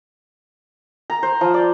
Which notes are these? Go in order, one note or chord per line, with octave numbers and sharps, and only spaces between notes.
A#5
C5
F3
D5